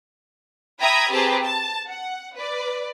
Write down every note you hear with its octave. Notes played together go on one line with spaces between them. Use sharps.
E5 G5 A#5 B5 D#6 G#6
C4 G4 G#4 B4 A5 A#5
A5
F#5
B4 D5